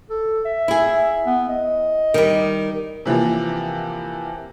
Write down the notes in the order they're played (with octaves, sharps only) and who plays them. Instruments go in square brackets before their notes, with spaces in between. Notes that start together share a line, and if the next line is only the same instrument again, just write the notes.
[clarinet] A4
E5
[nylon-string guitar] E4 G#4
[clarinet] B3
D#5
[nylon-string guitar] D#3 G3
[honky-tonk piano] C3 E3 F3 A#3